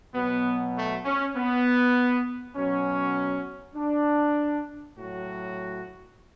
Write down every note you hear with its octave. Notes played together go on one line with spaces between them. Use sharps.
B2 F#3 B3
A3
C#4
B3
B2 F#3 C#4
D4
A2 F#3 F#4